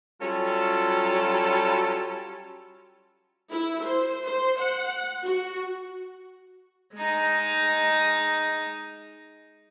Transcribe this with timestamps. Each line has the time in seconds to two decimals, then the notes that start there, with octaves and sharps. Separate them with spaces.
0.22 F#3 G3 C#4 F4 A4
3.52 E4
3.84 C5
4.27 C5
4.61 F#5
5.25 F#4
6.94 G#3 D#4